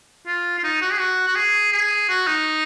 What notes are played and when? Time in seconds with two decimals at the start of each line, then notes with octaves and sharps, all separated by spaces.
0.27 F4
0.58 F4
0.64 D#4
0.81 F#4
0.92 G#4
1.00 F#4
1.27 F#4
1.36 G#4
1.73 G#4
2.09 F#4
2.27 D#4